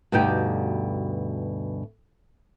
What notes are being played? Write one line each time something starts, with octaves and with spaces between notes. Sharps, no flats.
D2 G2 B2 D#4 G4 G5